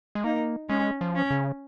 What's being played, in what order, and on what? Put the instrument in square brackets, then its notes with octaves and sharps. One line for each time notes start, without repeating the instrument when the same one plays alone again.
[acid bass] G#3
[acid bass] A#3 [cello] D#4
[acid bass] G#3 [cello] C#4
[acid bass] F3
[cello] C#4
[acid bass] C#3